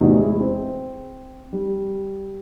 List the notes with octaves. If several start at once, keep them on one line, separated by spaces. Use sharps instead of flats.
E2 A2 C3 D#4 F#4
G#3 E4 G#4
C4
G3